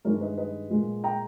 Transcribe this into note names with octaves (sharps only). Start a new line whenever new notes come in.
G2 D#3 G#3 A#4 C#5
B4 D#5
B4 D#5
A#2 G#3
G5 A#5